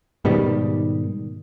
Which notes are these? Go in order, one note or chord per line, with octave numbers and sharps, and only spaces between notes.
G#2 B2 D#3 G3